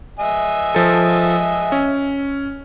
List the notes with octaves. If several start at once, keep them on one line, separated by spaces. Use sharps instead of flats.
D#5 E5 G#5
F3 A4
C#4